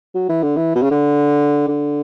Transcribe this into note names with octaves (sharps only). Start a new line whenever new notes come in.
F#3
E3
D3
E3
B2
C#3
D3
D3